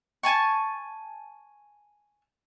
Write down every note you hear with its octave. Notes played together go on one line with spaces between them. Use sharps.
G#5 A5 C#6